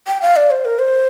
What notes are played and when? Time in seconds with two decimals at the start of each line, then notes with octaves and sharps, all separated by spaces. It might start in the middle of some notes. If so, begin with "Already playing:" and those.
0.07 G5
0.22 F5
0.36 D5
0.51 C5
0.65 A#4
0.79 C5